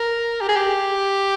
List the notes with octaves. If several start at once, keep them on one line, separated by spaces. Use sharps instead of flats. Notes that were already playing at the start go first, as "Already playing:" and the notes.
Already playing: A#4
G4
G#4
G4